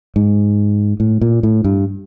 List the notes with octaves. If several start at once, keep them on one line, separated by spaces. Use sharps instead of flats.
G#2
A2
A#2
A2
G2